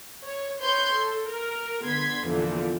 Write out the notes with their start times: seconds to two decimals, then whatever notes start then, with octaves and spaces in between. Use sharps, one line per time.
0.24 C#5
0.59 B4 C#5 C6 G6
0.93 A4
1.28 A#4
1.83 D3 B3 C6 G#6 B6
2.27 E2 A#2 D3 E3 F3